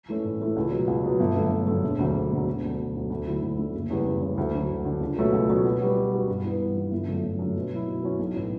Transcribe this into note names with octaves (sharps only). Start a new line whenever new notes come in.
E3 A3 C#4
A2
E3 A3 C#4
C#2
B2 F#3
C#2
B2 F#3
G1
F#2 D3 A3
G1
F#2 D3 A3
E1
D2 D3 F#3
E1
D2 D3 F#3
E1
D2 D3 F#3
E1
D2 D3 F#3
D2
D3 F#3 A3 E4
D2
D3 F#3 A3 E4
F#1
E2 C#3 E3 G3
F#1
E2 C#3 E3 G3
D2
D3 F#3
D2
D3 F#3
C#2
B2 F#3 A3 C#4
C#2
B2 F#3 A3 C#4
B2
G3 B3 F#4
B2
G3 B3 F#4
G2
E3 B3
G2
E3 B3
G1
F#2 D3 A3
G1
F#2 D3 A3
B2
F#3 C#4 E4
B2
F#3 C#4 E4
B1
A2 E3